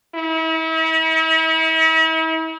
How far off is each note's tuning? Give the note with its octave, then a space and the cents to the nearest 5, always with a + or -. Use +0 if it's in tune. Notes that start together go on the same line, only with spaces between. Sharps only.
E4 -40